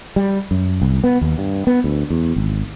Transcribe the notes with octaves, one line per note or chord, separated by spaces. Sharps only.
G3
F#2
C2
B3
D#2
G2
B3
D2
E2
G#1